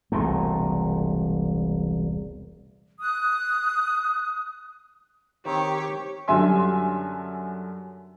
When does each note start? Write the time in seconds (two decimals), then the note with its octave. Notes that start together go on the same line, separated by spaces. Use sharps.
0.12 E1 C2 A#2 A3
3.01 D#6 F#6
5.46 D#3 C4 G4 C#5
6.28 F#2 D3 G3 E5 G#5 C6